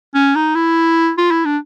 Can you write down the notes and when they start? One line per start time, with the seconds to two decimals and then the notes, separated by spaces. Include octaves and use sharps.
0.14 C#4
0.35 D#4
0.55 E4
1.18 F4
1.31 E4
1.45 D4